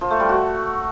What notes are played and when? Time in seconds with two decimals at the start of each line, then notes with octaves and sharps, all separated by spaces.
0.01 F3
0.10 A3
0.20 G3
0.29 F#4